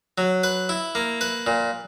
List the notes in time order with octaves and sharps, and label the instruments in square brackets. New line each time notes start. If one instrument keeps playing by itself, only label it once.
[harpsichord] F#3
B4
E4
A#3
B4
A#2